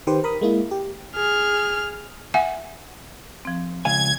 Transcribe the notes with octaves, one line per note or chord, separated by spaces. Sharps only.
D#3 G4 B4 C5
A#4 B5 D#6
G#3 A#3 E4
G4
G#4 F6
E5 F#5 G#5
F3 C4
C#2 F5 G#5 G#6